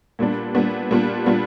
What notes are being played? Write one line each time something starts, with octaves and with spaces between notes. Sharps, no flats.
A#2 G3 B3 D4
A#2 G3 B3 D4
A#2 G3 B3 D4 F4
A#2 G3 B3 D4 F4